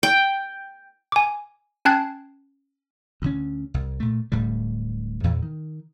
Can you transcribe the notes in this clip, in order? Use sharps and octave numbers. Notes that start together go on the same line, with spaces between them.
G5
G#5 D6
C#4 G5 A5 F#6 G#6 C7
D2 D3 C#4
C2
A#2 A3
D1 A2 D3 G3
E2 A#2 E3
D#3